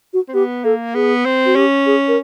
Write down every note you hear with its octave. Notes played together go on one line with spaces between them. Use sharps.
F#4
C4
B3 G4
A#3 A4
B3 G#4
C4
F#4
C#4 G4
G#4
A#4